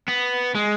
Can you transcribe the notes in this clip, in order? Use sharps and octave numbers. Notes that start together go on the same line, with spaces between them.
B3
G#3